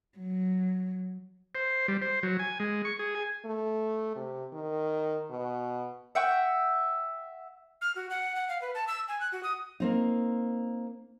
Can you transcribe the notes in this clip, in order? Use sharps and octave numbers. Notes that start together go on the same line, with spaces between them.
F#3
C5
G3
C5
F#3
G#5
G#3
C#6
G#4
G#5
A3
C3
D#3
B2
E5 F#5 G5 C#6
F6
F#4
F#5
F#5
F5
B4
A5
E6
G#5
F#6
F#4
D#6
A#3 C4 D#4